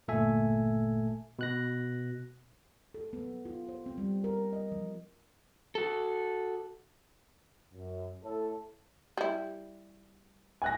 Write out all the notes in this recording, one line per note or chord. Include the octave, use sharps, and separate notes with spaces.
G1 A#2 A3 A4 E5 G#5
B2 F#6 A#6
A4
B3
F#3
F4
C5
C4
G3
A#4
D#5
F3
F#4 A4
F#2
A2 A4
G3 E4
G#5 F#6 A#6